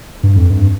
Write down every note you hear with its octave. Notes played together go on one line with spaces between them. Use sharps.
G2
F2
G2